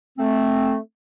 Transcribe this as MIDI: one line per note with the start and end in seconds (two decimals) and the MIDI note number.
0.18 0.77 57
0.18 0.77 60